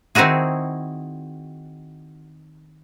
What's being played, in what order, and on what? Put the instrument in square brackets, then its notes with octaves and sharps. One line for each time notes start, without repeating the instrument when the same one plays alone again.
[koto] D#3 C4 D#4 E4 F#4 G#4